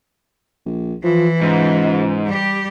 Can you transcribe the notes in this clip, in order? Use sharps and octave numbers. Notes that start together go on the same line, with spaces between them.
A#1
E3 F3
C#2 G#2
G3 G4